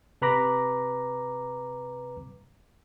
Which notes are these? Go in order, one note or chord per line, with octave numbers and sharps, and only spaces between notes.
C3 B4 A#5 B5 D6 A#6